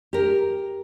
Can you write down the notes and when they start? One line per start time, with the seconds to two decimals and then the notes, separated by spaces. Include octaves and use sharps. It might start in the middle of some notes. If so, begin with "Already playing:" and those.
0.13 G4 A#4